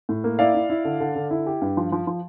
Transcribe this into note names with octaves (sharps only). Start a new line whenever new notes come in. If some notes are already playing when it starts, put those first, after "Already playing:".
A2
A#3
E4 D5 F5
E4
E4
D3
D3
D3
E4
G4
G2
F3
F3
F3